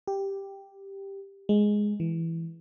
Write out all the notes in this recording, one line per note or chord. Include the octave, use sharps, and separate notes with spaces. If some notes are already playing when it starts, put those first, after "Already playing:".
G4
G#3
E3